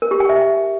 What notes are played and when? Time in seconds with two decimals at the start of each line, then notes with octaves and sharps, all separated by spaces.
0.02 A#4
0.11 G4
0.20 G5
0.29 E5